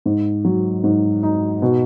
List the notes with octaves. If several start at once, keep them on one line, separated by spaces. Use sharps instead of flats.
G#2
F#3
G#2
D#4
B2